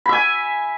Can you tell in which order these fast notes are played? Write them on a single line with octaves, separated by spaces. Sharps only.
B5 E5 G#5